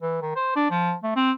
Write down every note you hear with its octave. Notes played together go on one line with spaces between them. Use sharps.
E3
D#3
C5
D4
F3
A3
C4